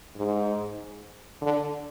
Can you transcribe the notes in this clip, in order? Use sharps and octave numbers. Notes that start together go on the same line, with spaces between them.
G#2
D3